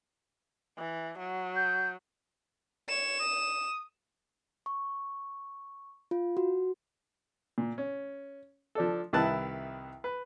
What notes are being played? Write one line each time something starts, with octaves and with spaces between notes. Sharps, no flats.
E3
F#3
G6
C#5 E7
D#6
C#6
F4
F#4
A#2
C#4
F3 D4 A4
C2 D#3 E4 B4 A5 F#6
B4